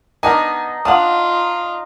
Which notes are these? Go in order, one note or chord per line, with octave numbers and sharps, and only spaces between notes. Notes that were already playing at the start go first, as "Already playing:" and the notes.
B3 D4 D#4 A#4 D#5 G#5
D4 F4 F5 F#5 D#6